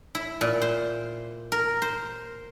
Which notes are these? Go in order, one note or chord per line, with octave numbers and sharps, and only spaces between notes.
E4
A#2
C5
A#4
C5